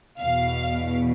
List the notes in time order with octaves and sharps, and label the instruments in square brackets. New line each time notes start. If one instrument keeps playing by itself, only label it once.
[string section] E2 B2 F5